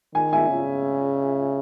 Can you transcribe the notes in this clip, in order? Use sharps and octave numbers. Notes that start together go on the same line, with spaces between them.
D#3 G#5
E5 G#5
C#3